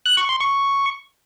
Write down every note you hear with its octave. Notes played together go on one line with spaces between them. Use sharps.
F#6
C#6
C6
C#6